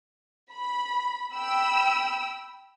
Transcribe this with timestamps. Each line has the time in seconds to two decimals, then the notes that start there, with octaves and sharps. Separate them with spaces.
0.51 B5
1.33 G5 B5 E6